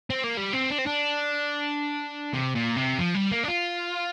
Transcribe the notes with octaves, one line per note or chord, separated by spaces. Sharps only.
C4
A#3
G3
C4
D4
C4
D4
C3
A#2
C3
F3
G3
A#3
D4
F4